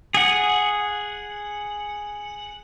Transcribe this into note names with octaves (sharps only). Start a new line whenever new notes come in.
G#4 F#5